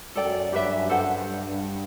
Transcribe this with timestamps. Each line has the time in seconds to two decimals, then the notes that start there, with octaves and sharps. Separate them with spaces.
0.15 F#2 A4 D5 G5
0.52 G2 G4 B4 E5
0.89 G2 A4 C5 F#5